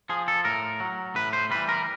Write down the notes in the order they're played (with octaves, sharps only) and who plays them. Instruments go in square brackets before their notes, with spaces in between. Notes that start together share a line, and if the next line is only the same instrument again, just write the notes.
[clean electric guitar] F3 G#4
A4
A2 A#4
F#3
A2 B4
C5
E3 G3 B4
A#4